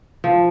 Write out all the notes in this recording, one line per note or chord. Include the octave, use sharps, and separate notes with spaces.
F3